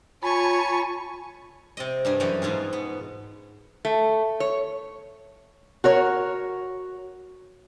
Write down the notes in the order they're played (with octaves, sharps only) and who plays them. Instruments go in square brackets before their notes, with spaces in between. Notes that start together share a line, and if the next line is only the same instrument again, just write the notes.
[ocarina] F4 [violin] C#5 C#6 [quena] G#5 [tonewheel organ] A5 B5
[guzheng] C3 C4 D#5
G2 G3 G#4
F#2 E3 G3 G4 C#5 D#5
G#2 B2 F4 G#4
B3
[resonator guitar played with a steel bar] A3
C#5
F#4 A#4 C#5